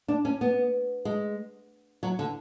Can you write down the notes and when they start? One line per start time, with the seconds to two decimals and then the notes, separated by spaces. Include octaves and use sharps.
0.08 D4
0.25 C#4
0.41 B3
1.05 G#3
2.03 F#3
2.19 D3